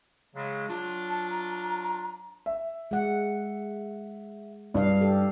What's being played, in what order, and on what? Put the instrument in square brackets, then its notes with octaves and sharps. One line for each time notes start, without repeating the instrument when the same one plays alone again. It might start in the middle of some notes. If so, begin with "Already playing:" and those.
[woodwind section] C#3 F#3 G#3
F#3 D4 F4
[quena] A5
A#5
[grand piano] E5
[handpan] G#3 F#5
[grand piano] G2 [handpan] E4 D#5 F5
[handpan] G4 A4